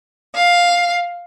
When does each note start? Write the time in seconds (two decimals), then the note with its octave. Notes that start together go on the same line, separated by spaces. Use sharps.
0.36 F5